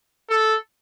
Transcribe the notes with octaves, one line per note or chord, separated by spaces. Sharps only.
A4